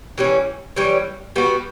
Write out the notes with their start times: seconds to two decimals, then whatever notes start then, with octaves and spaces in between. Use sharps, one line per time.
0.18 E3 G3 C#4
0.76 E3 G3 C#4
1.36 G3 B3 F#4